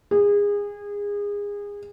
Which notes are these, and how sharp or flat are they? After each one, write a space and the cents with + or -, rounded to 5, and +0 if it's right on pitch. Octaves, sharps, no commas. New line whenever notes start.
G#4 -25